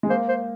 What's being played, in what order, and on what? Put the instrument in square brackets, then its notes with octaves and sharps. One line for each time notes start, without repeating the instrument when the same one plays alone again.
[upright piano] G#3
[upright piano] A#3 [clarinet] C5
[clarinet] C5